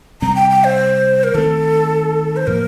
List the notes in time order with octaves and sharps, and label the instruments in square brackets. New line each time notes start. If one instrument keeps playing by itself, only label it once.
[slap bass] C3 G3 C4 [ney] A#5
[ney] G5
G5
C5
A#4
[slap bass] D#3 A3 C4 [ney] A4
[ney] C5
[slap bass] A2 F3 A#3 [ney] A#4